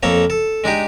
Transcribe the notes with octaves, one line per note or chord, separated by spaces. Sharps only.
F2 A#3 A4 C#5
A4
G#3 D4 D#4 G4